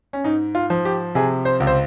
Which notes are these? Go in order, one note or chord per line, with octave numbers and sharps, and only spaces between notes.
C#4
G#2 D#4
F4
F3
G4
C3 G#4
C5
C#2
C5